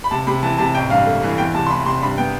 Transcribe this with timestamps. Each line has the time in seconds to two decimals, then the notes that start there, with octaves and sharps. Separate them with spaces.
0.04 B5
0.11 C3 A5
0.27 C3 B5
0.43 E3 A5
0.58 C3 A5
0.75 A1 G5
0.90 G2 F5
1.06 A3
1.23 E3
1.38 E2 G5
1.55 C3 A5
1.67 C6
1.70 E3 B5
1.86 C3 C6
2.02 G2 B5
2.18 B3 G5